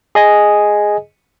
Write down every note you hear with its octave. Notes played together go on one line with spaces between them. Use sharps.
G#4 D#5 G#5